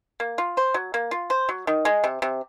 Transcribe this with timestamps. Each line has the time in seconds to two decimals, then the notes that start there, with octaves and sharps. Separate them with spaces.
0.20 A#3
0.38 F4
0.57 C5
0.74 F#3
0.94 A#3
1.11 F4
1.30 C5
1.49 F#3
1.67 D#3
1.85 G#3
2.04 C3
2.22 C3